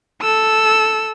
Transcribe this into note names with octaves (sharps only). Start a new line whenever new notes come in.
A4 E6